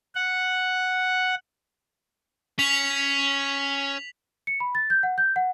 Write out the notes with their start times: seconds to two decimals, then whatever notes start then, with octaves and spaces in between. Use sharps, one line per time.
0.15 F#5
2.59 C#4 B6 F7 F#7
4.47 C#7
4.60 B5
4.75 A6
4.90 G6
5.03 F#5
5.18 G6
5.36 F#5